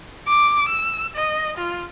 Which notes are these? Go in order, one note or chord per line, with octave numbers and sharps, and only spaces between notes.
D6
E6
D#5
F4